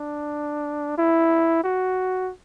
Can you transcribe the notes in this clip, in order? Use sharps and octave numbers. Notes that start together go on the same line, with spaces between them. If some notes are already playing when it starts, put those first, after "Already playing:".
Already playing: D4
E4
F#4